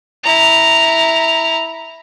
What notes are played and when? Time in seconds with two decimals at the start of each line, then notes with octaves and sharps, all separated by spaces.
0.23 E4 A#5